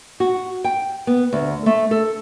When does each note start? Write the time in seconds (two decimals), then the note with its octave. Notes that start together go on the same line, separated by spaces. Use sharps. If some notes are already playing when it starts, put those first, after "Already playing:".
0.20 F#4
0.64 G5
1.07 B3
1.33 D2
1.66 A3
1.91 A4